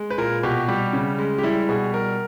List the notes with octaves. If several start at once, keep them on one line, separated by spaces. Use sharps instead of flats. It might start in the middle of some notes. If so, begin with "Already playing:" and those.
Already playing: G#3
B4
A#2 A#4
B2 G4
G3 G4
C#3
G#3
G4
G3 E4
B2 G#4
G3 A#4